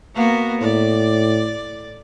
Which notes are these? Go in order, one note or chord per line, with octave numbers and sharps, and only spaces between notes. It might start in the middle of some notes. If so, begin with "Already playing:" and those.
A#3 B3 F#4
A2 D5